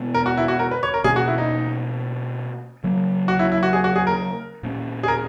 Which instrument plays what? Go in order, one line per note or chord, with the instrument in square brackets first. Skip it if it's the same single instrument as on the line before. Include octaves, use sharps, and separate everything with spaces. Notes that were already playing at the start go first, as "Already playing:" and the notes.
Already playing: [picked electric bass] B2 G#3 B3
[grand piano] A#4
F#4
E4
F#4
A#4
B4
C#5
A#4
[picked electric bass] B2 A#3 C#4 [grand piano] G#4
[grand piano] F#4
E4
D#4
[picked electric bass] C#3 F#3 A#3
[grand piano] F#4
E4
E4
F#4
G#4
F#4
G#4
A#4
[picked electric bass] A#2 A#3 C#4
[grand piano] G#4
A#4